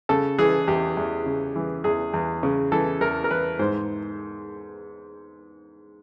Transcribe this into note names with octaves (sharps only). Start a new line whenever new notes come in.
C#3 A4
E3 G#4
E2 G4
E2
C#3
E3
E2 G#4
E2
C#3
E3 A4
E2 A#4
A#4
E2 B4
G#2 C5